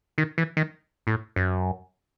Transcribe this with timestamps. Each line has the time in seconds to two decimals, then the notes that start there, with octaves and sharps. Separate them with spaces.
0.18 D#3
0.38 E3
0.57 D#3
1.07 A2
1.36 F#2